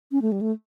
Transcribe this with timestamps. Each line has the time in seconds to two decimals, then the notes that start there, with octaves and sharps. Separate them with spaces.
0.12 C#4
0.22 A3
0.32 G3
0.41 A3